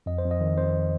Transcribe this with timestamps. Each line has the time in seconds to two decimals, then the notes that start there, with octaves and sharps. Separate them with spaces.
0.06 F2 D#5
0.18 C5
0.24 F2
0.31 D#5
0.41 D#3
0.58 F2 C5